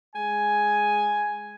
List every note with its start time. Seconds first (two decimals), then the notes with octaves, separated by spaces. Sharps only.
0.15 G#3 G#5